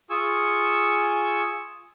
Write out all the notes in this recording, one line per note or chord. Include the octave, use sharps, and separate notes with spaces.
F4 G#4 G#5 C#6 E6